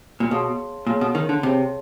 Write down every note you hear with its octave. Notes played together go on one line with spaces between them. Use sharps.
A#2
B2 G#4 C#5 F5 A5 C6
A#2 G#4 C#5 F5 A5 C6
B2
D#3
D3
C3 G#4 C#5 F5 A5 C6